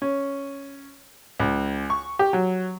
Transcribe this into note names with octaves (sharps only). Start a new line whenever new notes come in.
C#4
C#2
C#6
G4
F#3